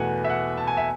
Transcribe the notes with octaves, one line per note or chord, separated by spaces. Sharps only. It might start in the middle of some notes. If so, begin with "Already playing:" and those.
Already playing: E2 B2 A3 F#5 G#5
E5
F#5
A5
G#5
E5